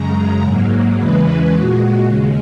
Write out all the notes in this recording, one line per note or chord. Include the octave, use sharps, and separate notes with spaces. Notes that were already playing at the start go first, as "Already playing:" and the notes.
Already playing: F#2 C#3 G#3 A#5
G#2 F#3 A#3
E2 C#3 E3 G#3 B4
A#2 G#3 F#4
D#2 C#3 G#3